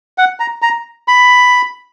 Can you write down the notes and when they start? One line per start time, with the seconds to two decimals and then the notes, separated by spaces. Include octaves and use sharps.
0.18 F#5
0.40 A#5
0.62 A#5
1.08 B5